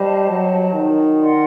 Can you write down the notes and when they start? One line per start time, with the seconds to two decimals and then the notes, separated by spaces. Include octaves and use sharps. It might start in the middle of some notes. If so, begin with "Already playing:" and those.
Already playing: G3 C5 D#5 A5
0.30 F#3
0.73 D#3
1.16 A#4 D5 F#5 C6